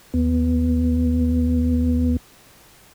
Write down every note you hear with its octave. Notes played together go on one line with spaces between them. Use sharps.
D#2 B3